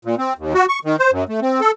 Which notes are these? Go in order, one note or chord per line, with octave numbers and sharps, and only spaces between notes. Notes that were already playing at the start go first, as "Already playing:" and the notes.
A#2
C4
D#2
F#4
C#6
D#3
C5
F#2
A3
C4
A4